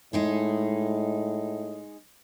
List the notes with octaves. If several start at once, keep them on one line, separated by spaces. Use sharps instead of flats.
A2 G#3 D#4 G#4